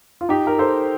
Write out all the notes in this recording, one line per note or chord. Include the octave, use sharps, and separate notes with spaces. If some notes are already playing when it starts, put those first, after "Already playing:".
F4
D#4 G4
A#4
A4 C5